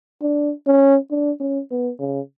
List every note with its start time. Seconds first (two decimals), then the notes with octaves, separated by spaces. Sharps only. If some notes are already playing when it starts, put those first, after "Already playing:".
0.22 D4
0.67 C#4
1.11 D4
1.40 C#4
1.71 B3
2.00 C#3